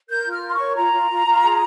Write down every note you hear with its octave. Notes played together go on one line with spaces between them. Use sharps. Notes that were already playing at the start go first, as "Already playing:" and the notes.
A#4 G6
F4
F6
A#4
C6
C#5 C#6
F4 A#5
F4
F4
F4
G#4